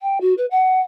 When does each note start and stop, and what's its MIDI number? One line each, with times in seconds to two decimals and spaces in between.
0.02 0.19 79
0.21 0.34 66
0.38 0.46 71
0.51 0.81 78